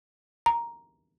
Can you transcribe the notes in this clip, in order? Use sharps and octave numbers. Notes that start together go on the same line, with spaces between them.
A#5